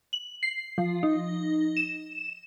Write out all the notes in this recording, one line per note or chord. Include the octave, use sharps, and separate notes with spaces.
F#7
C7
F3
D#4
E7